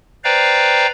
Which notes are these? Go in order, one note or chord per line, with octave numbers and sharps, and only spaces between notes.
B4 C5 D5 F5 G5 A#5